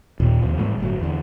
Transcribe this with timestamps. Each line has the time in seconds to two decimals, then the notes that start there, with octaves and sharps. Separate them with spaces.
0.20 D#2 A#2
0.42 D#2 C3 F3
0.57 A1 G#2 G3 A3
0.78 G1 A2 F#3
0.99 E2 D3